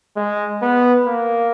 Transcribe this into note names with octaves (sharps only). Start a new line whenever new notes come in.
G#3
B3
A#3